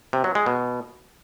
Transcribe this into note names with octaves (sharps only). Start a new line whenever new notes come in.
C3
F#3
G#3
B2